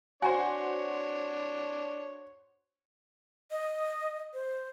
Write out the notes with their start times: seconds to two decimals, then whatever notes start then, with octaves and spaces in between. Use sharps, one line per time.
0.22 D4 F#4 C5 C#5 G#5 A#5
3.51 D#5
4.34 C5